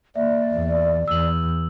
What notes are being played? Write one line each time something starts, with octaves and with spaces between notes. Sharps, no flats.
A#3 D5 E5
E2
E2 E6 F#7